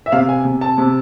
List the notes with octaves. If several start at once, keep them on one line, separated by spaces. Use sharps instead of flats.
E5
C3 F5
G#5
C3
A5
C3